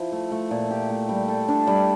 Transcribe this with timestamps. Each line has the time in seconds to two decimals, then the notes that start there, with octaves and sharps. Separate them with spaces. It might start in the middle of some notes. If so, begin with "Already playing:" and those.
Already playing: F3 E4
0.12 A3
0.32 A3
0.51 A#2
0.71 G4
0.90 A3
1.09 G3
1.28 A4
1.48 D4
1.67 G3